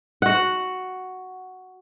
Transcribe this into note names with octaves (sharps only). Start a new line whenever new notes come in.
F#4 F#5